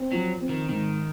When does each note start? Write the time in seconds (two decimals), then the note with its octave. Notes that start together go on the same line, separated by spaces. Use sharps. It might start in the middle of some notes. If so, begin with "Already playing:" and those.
Already playing: C4
0.12 F3 F#3
0.41 C4
0.49 D#3
0.69 G#2 D#3